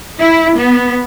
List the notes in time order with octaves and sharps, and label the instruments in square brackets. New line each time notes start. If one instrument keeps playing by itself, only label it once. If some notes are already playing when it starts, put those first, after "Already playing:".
[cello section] E4
B3